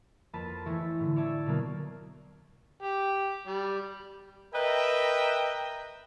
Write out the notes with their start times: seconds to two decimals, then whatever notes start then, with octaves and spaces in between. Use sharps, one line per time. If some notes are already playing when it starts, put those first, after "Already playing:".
0.33 F2 A#3 B4 A5 B6
0.66 E3 A3 E4 B4 C#5 A#6
1.00 A2 D3
1.16 C#5 D5 E5 A5 G#6
1.46 B2 D3 F#3 A#3
2.82 G4
3.47 G3
4.54 A#4 B4 D#5 E5 G5 A#5